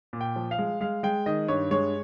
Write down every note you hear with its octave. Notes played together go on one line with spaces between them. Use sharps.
A#2
G5
F3
F5
G#3
G#3 F5
G#3 G5
D#3 D#5
G2 C#5
G#3 C#5